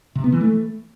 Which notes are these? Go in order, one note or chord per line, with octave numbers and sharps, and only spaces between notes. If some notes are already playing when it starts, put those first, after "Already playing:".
C3
B3
E3
A3